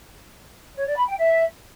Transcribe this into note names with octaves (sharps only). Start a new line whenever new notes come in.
C#5
D5
B5
G5
E5